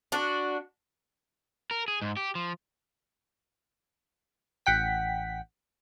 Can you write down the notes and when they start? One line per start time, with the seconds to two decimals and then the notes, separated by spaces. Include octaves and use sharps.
0.12 D4 F#4
1.71 A#4
1.88 G#4
2.02 G#2
2.17 G4
2.35 F3
4.66 A1 F#5 G5 B6